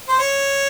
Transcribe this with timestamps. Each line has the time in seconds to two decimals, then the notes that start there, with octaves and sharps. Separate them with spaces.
0.09 C5
0.19 C#5